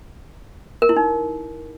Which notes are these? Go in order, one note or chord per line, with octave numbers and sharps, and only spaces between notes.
A#4
E4
D#4